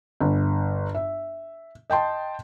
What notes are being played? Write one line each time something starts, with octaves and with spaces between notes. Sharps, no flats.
G1
E5
D#5 G5 A5 C6